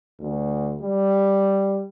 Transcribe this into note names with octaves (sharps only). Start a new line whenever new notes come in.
D2
G3